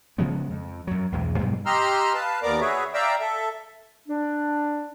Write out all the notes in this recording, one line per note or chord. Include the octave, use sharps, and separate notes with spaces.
C#3 F3 G#3 B3
F2
F#2 F#3
B1 E2 G#3
G2 B2 F#3 G3
G4 D#5 A#5 C6 E6 F6
B4 F5 A5
D#2 B3 A#4 D5 A#5 D6
F#4 G#4 B4 C#5 E5
D5 E5 F5 G5 A#5 E6
A4 E5
D4